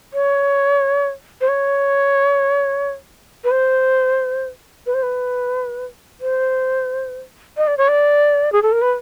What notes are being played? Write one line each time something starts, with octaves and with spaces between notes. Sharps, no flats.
C#5
C5
C#5
B4
C5
B4
C5
B4
C5
D#5
D5
C#5
D5
G#4
A4
A#4
B4